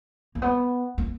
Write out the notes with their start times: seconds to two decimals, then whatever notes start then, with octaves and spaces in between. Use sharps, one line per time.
0.35 A#3
0.42 B3
0.98 A#3